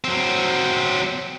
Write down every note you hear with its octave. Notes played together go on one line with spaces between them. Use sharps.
F#3 C4